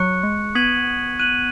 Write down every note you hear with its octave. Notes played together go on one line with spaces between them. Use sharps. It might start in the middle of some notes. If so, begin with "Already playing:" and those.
Already playing: F#3 C#6 F#6 C#7
G#3
B3 D#6 G#6 B6 D#7 F#7
F#6 D#7 F#7